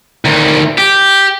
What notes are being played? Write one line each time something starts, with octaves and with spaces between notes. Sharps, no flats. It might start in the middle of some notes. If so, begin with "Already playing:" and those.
D2 D#3
G4